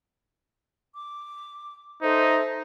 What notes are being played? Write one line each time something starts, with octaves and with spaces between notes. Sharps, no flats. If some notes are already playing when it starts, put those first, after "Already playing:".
D6
D#4 A4 C5 E5